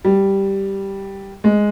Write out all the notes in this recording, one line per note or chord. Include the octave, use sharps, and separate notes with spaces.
G3
G#3